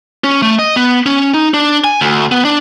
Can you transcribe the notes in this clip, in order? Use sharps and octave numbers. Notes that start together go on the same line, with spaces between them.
C#4
A3
D#5
B3
C#4
D#4
D4
G#5
D2
B3
D4